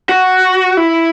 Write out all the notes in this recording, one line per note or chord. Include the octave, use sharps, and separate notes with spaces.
F#4
E4